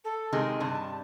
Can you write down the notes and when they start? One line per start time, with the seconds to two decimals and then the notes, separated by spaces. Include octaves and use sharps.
0.04 A4
0.32 C3 D#3 G#3
0.60 G2 C3 A5